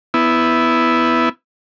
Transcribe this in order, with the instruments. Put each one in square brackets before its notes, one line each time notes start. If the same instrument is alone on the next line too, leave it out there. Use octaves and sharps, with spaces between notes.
[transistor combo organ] B3 E4